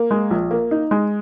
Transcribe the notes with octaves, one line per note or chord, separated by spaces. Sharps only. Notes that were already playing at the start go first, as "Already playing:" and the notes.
Already playing: A#3
G#3
A#1
A#3
D#4
G#3